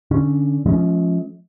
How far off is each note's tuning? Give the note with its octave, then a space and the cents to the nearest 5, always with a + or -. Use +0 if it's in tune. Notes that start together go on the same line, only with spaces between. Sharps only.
D3 +0 C#4 +0
F3 +0 G#3 +45 C#4 +0